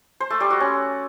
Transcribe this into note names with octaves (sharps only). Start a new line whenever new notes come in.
C5
A3
G3
F#4
C#4